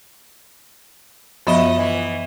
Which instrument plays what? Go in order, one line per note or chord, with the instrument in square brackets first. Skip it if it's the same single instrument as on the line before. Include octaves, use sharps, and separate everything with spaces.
[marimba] F#2 B3 E5 [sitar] F3 D#5
[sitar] E3